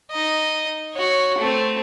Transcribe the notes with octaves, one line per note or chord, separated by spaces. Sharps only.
D#4 D#5
F#4 C#5
A3 C4